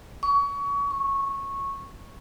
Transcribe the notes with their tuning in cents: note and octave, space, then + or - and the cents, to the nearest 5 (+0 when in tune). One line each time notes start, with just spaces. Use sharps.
C#6 +30
C#6 -15